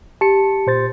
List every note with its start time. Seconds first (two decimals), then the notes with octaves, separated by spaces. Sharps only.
0.21 G4 A5 C#7
0.67 A#2 C5 A6